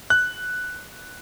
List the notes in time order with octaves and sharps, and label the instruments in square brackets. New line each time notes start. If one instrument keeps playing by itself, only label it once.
[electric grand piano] F#6